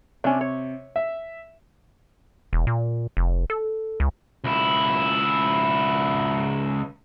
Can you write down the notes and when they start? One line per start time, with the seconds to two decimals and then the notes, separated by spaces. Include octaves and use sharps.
0.24 C3 C#4 D4
0.41 C#5
0.96 E5
2.53 E1
2.67 A#2
3.17 F1
3.50 A4
4.00 C#2
4.44 C#2 E4